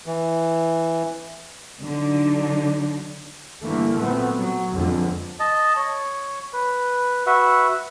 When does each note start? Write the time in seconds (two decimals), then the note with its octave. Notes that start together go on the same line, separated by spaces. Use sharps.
0.06 E3
1.82 D3 F#3 D4 D#4
3.63 G2 D3 E3 A3 A#3
3.96 A#2 F#3 A3 B3 C4
4.40 F#3
4.75 F2 D3 G#3 B3
5.40 D#5 A5
5.76 C#5
6.53 B4
7.26 F#4 B4 E5 F#5